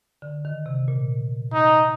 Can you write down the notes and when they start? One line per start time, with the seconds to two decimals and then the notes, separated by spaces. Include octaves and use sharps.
0.22 D3
0.45 D#3
0.66 C3
0.88 A#2
1.53 D#4